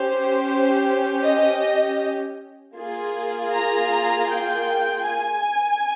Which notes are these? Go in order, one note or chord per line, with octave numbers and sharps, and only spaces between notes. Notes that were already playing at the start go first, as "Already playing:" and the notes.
Already playing: C#4 G4 C5
D#5
A#3 F4 G#4
A#5
G5
G#5